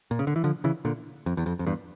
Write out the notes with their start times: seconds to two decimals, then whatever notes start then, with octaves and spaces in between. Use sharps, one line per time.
0.11 A#2
0.19 C#3
0.27 D3
0.36 E3
0.44 D3 F3
0.64 C#3 E3
0.85 A#2 D3
1.26 F2
1.37 E2
1.46 F2
1.59 F2
1.67 E2 G2